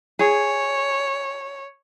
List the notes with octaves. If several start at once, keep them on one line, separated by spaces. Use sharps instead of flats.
G#4 C#5